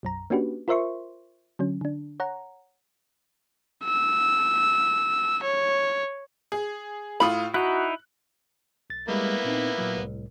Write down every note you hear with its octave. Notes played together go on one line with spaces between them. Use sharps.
B1 F#2 A#5
A#3 C#4 D4 F#4 G4 B4
F4 A#4 C5 E5 C6 C#6
D3 F#3 C#4
D3 D4
C#5 F#5 A#5
E6
C#5
G#4
A2 F4 B5 D#6
D#4 E4 F#4 F#6
B1 A6
G3 G#3 A#3 B3 E4
A#2 C4 D#4
A#2 F#3
C2 A2